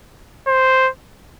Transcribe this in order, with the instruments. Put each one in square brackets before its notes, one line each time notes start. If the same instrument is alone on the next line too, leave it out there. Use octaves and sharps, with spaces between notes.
[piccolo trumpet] C5